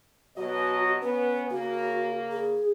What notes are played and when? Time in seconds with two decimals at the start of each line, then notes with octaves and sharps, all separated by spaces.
0.37 B2 F#3 F#4 D#5
1.02 B3 C#4 B4
1.50 C#3 A#3 F#4
2.32 G#4